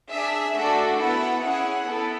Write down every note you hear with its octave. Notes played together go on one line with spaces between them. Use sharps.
D4 G#4 E5
A3 D4 F#4 A4 E5
B3 E4 A4 F#5
C#4 E4 G#4 F#5
B3 E4 A4